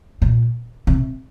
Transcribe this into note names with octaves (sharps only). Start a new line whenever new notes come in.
A#2
C3